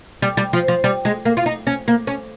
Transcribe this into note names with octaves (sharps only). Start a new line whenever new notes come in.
G3
G3
F3
F3
G3
G#3
A#3
F4
D#4
C#4
A#3
C#4